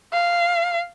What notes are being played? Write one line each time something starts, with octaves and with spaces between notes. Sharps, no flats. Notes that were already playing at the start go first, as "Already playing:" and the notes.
F5